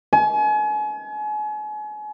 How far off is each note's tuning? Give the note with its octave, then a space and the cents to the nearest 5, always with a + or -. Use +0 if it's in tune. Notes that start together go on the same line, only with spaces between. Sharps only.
G#5 +35